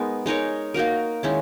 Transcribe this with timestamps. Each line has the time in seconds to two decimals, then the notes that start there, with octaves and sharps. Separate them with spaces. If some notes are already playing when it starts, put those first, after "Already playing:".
Already playing: G#3 B3 D#4 A#4
0.26 G#3 D#4 A#4 C#5
0.74 A#3 D#4 F#4 A#4
1.23 D#3 G#3 C#4 E4